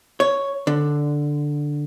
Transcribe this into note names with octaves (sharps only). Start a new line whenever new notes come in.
C#5
D3